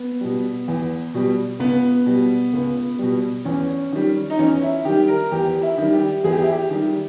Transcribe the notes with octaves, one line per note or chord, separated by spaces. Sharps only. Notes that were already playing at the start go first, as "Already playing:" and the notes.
Already playing: B3
B2 G3
E2
B2 G3
C#2 B3
B2 G3
C#2
B2 G3
E2 C#4
D#3 G3
D#4
E2 C#4
E4
D#3 G3 G4
A#4
E2 G4
E4
D#3 G3
G4
E2 G#4
G4
E4
G4
D#3 G3